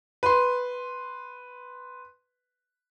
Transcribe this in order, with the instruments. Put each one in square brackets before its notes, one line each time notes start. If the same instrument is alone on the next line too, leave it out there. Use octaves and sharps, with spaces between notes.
[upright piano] B4 C6